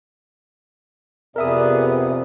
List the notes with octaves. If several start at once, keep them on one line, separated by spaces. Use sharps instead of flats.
F2 C3 B3 G#4 A#4 D5 E5 D#6